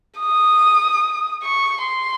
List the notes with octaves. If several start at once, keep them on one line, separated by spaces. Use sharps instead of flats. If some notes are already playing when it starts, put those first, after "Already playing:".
D#6
C#6
C6